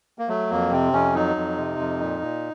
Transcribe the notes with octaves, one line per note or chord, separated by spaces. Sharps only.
A#3
F#3 A3
F2 A#3
C3 C4
F2 C#4
F#3 D#4
F2
C3
F2
A#2
A#2